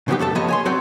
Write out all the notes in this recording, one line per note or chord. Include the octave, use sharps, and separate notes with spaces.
C#3 F3 F#3 B3 D#4 G4
F#2 A3 A4 A5
F3 G#3 A#3 B3 C#5 D#5
C#5 G#5 C6
F#3 C4 F#4 G4 C#5 D5